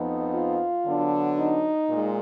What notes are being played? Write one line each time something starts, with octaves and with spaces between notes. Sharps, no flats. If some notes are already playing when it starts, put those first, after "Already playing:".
Already playing: F2 F3 B3 D#4
F4
D3 F#3 B3 D4
D#4
A#2 G#3